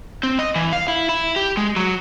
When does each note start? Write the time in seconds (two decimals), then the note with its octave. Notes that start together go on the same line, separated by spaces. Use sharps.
0.23 C4
0.39 D#5
0.56 E3
0.73 F5
0.88 E4
1.09 E4
1.36 G4
1.57 G#3
1.76 F#3